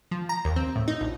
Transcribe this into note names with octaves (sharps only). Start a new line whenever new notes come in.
F3
A#5
D#2
C4
A2
D#4
A#1